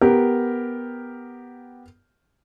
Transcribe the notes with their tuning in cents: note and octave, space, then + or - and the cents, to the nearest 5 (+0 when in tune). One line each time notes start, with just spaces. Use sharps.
B3 +0 G4 +0 A#4 +0